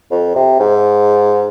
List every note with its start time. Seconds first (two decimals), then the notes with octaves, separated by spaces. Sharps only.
0.11 F2
0.35 C3
0.60 G#2